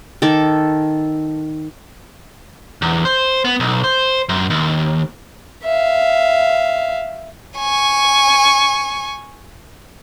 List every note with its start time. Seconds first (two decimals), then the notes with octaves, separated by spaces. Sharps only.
0.22 D#3 A4 A5 D6
2.82 E2
3.05 C5
3.45 B3
3.60 B1
3.84 C5
4.29 F#2
4.50 D#2
5.64 E5 F5
7.58 G#5 C#6